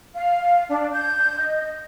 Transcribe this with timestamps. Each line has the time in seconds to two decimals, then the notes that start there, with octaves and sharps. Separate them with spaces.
0.15 F5
0.69 D4
0.92 G6
1.38 D#5